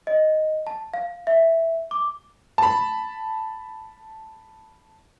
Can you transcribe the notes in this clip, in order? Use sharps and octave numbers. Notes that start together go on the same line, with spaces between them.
D#5
A5
F5
E5
D6
A5 B5